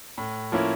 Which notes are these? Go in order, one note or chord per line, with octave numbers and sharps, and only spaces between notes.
A2
F3 A#3 C#4 E4